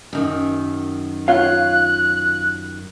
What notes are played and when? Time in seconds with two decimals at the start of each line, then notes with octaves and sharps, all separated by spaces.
0.13 F#2 D#3
1.28 F4 C#5 F5 F#6